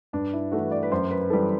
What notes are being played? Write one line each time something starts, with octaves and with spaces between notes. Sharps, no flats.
G2 D4
E4
E3 A3 F#4
D5
B4
F#2 C5
B4
B4
E3 G3 A4